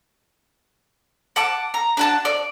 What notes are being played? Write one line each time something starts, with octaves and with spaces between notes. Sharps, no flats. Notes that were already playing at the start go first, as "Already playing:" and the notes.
F#5 A5 D6
A#5
D4 F#4 A5
D5